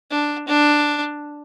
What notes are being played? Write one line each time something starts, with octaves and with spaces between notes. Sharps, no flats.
D4
D4